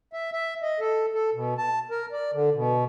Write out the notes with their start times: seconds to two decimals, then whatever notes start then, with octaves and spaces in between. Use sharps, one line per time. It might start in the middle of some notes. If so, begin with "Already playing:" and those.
0.13 E5
0.33 E5
0.62 D#5
0.80 A4
1.14 A4
1.34 B2
1.58 A5
1.91 A#4
2.12 D5
2.34 D3
2.55 B2